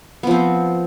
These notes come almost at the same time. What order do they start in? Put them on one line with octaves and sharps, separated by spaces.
B3 F3 C4